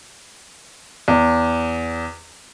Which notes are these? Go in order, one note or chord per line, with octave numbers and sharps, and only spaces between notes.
E2